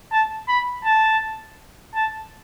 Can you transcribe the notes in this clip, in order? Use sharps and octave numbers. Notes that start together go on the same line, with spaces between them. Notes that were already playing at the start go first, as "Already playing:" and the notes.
A5
B5
A5
A5